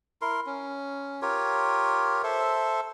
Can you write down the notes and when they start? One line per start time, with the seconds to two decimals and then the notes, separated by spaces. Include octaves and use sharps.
0.22 E4 A#4 C6
0.46 C#4
1.22 F4 G4 A#4 C#5
2.23 A4 C5 E5